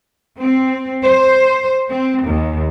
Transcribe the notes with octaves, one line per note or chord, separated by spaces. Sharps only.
C4
C5
C4
D#2